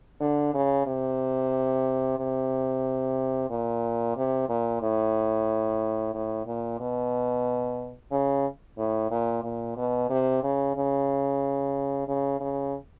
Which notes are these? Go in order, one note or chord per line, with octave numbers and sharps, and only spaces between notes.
D3
C#3
C3
C3
A#2
C3
A#2
A2
A2
A#2
B2
C#3
A2
A#2
A#2
B2
C3
C#3
C#3
C#3
C#3